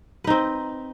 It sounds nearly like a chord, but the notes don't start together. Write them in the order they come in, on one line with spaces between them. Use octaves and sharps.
B4 D#4 C4